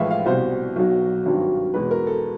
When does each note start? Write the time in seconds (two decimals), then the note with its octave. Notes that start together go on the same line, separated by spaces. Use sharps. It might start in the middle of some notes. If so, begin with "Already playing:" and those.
Already playing: A1 A2 F3 G#3 B4 E5 F5
0.11 F5
0.26 C2 B2 G3 C5
0.76 B1 B2 F#3
1.25 G#1 G2 D#3 F#3
1.74 E2 B2 G#3 B4
1.91 A#4
2.07 A4